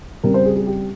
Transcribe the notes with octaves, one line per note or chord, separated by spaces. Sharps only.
C#3 G3 C4 A#4
C5
G#4
G#4
G4